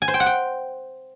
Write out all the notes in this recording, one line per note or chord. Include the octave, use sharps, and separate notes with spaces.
G#5
C5
G5
F#5
G5